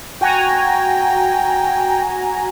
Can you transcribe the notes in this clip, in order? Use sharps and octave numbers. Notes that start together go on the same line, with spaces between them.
F#4 G5 G#5 A#5